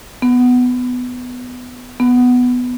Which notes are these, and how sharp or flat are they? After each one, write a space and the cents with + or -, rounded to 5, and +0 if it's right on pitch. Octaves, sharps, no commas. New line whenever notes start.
B3 +10
B3 +5